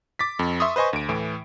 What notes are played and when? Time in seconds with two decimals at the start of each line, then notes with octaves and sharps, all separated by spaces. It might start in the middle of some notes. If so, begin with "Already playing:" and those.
0.19 D6 A6 B6
0.39 F2
0.60 E5 C6 C#6 D#6
0.76 B4 C5 D#5 G#5 C#6
0.93 D2 D7
1.09 A2 E3